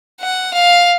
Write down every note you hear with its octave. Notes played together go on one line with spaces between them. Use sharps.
F#5
F5